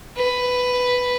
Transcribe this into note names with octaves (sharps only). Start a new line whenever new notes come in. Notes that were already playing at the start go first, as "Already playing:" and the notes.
B4